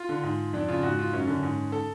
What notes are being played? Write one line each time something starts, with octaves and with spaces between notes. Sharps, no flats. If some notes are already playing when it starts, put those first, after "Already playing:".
Already playing: F4
D3
G#2
F2 D4
C#3 F4
G#2 F#4
F4
F#2 C#4
D3
G#2
A4